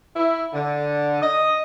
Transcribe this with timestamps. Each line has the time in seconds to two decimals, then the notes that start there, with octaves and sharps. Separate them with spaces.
0.16 E4
0.52 D3
1.21 D#5